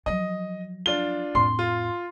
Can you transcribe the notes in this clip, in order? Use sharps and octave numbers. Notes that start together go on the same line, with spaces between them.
F3 F#3 D#5
D4 F4 G7
F2 A2 C6
F4